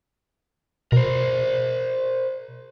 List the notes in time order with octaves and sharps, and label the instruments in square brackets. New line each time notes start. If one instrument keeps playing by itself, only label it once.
[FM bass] B2 [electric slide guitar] A#4 C5